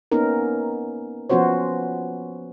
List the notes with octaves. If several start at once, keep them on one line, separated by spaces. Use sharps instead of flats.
A#3 B3 C#4 D#4 A#4
F3 B3 C#4 F#4 C5 C#5